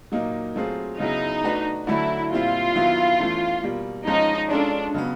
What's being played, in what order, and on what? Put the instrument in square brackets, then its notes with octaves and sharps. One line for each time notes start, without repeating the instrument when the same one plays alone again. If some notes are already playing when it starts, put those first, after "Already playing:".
[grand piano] A#2 F#3 A#3 D#4
F#3 A3 C4 F4 G#4
[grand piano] C#3 F#3 B3 E4 G#4 [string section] D#4
[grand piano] A3 D4 F#4 B4
[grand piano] D3 F#3 A3 [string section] E4
[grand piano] A#2 G3 C4 E4 [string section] F4
[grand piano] D#3 F#3 B3 E4
E3 A3 C#4
B2 G3 A#3
[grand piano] F3 G#3 C#4 [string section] D#4
[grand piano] G#3 C#4 F4 A4 [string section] D4
[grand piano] C#3 F#3 B3